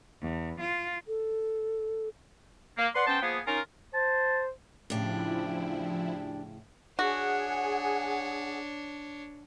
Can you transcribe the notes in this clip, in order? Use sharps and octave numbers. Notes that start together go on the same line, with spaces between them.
E2
F4
A4
A#3
B4 D5 F#5 C6
B3 C#4 C5 G5 A5
F3 A#3 B3 G#4
C#4 D#4 F4 A#4
C5 A5
A2 C#3 F3 D4 E4 G4
D4 F#4 G#4 C#5 F#5